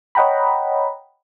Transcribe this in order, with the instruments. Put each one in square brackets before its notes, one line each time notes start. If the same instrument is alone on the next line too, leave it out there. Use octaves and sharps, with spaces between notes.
[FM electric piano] C#5 D#5 F#5 G5 A#5 B5